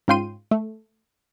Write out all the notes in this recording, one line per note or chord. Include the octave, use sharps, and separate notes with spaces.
G#2 C#4 F4 G5 C6 D#7
A3